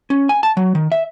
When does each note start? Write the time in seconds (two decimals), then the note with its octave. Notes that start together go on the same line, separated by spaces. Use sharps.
0.10 C#4
0.29 G#5
0.43 A5
0.57 F#3
0.75 D#3
0.92 E5